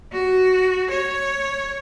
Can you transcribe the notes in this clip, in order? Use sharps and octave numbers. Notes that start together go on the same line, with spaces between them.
F#4
C#5